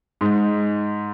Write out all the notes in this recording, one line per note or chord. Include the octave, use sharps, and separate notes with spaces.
G#2